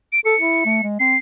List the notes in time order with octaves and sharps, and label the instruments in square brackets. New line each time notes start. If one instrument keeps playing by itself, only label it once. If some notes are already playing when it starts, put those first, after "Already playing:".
[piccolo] D7
[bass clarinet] A4 [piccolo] C#7
[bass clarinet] E4
A3
G#3
[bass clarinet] C4 [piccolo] C7